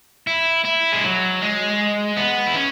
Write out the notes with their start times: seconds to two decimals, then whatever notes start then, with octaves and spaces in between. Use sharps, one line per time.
0.27 E4
0.65 E4
0.92 G#3
1.04 F#3
1.41 G#3
2.17 B3
2.47 E4
2.55 C#4